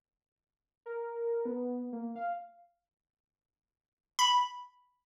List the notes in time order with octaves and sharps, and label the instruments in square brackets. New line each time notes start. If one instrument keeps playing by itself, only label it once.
[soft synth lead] A#4
B3
A#3
F5
[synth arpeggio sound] B5